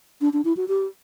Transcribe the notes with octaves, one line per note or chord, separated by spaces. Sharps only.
D4
D4
E4
F#4
G4